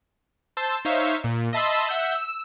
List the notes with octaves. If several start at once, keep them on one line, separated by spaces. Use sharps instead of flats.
C5 A5 C6 E6
D#4 C5 C#5 E5 F5
A#2
D#5 E5 A5 B5 C6 E6
E5 F#5 E6 G6
E6